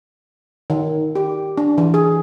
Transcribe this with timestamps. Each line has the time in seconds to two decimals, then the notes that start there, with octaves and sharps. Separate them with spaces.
0.70 D#3
1.15 G4
1.58 D4
1.78 E3
1.94 G#4